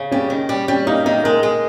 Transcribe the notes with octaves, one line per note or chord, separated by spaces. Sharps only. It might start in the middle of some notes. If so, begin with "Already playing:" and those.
Already playing: C#3
G3 C#4
D#3
G3
G3 C#4
A#3 D#4
D#3 D#4
G#3 A#4
G#3